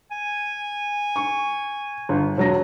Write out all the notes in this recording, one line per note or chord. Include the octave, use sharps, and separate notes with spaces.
G#5
C#6
G1
E1 F#3 A#6